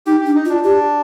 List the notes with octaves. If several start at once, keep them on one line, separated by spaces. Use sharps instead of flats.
D#4 G4
D4 G4
D#4
F4
D4
D4 G4